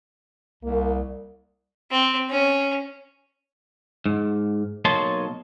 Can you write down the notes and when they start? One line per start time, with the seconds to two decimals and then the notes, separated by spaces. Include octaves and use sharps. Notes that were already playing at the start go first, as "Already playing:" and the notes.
0.64 C2 A#3
1.91 C4
2.30 C#4
4.06 G#2
4.85 B1 A#3 C#5 D#5 A5 C6